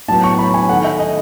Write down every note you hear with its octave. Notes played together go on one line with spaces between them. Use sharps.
A2 F#3 B3 A5
C#6
B5
G#5
D#3 A3 F#5
E5
D#5